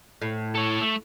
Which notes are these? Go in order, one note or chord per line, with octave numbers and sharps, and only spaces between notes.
A2
A4 C#5
A3